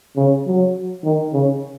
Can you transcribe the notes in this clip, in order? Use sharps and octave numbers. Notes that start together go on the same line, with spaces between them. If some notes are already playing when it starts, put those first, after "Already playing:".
C#3
F#3
D#3
C#3